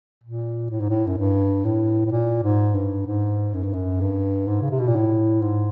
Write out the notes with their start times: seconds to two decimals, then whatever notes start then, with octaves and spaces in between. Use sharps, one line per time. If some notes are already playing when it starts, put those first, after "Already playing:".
0.23 A#2
0.70 A2
0.80 G#2
0.89 A2
1.07 F#2
1.18 G2
1.65 A2
2.06 A2
2.11 A#2
2.43 G#2
2.74 G2
3.06 G#2
3.54 F#2
3.63 G2
3.73 F#2
4.01 G2
4.47 G#2
4.62 C#3
4.71 C3
4.79 B2
4.88 A#2
4.95 A2
5.42 G#2